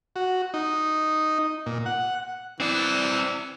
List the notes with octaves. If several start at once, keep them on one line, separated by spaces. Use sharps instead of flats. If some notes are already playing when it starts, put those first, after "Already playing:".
F#4
D#4
A#2
F#5
E3 C4 D5